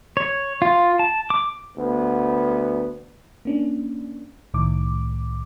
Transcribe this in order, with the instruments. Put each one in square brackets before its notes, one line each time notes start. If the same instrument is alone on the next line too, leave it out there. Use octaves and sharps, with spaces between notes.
[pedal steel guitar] C#5
F4
A5
D6
[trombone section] D2 B3
[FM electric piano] A#3 C#4 D4
C2 A2 D#3 D6